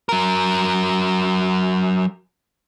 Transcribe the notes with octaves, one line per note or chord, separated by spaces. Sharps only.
F#3 A#4